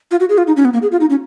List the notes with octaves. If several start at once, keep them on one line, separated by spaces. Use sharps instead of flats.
F4
F#4
G#4
F4
D#4
C#4
B3
A#3
G#4
F4
D#4
C#4